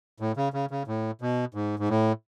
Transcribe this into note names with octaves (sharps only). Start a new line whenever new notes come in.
A2
C#3
C#3
C#3
A2
B2
G#2
G#2
A2